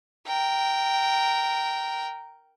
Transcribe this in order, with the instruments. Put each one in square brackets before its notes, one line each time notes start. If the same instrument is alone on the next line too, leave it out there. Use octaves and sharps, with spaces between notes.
[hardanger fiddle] A#4 G5